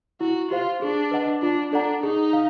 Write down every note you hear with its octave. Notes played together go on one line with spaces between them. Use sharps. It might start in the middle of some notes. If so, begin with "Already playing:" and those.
E4 F#4
F4 G4 C5 F5
D4 G#4
B4 D#5 F#5 A5
D4 F4
D4 A4 D5 F#5 A#5
D#4 G#4
F5